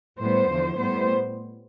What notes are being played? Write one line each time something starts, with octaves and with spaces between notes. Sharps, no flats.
A2 G3 B3 C5
E2 D3 F3
A2 G3 B3 C5